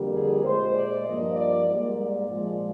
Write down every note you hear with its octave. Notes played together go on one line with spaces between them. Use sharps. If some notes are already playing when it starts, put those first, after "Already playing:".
Already playing: F2 D3 G3 A#3
G#4
A#2 G#3 C5
D5
G2 F3 A#3 D#5
D5
G#2 G3 A#3
D5
A#2 F3 G#3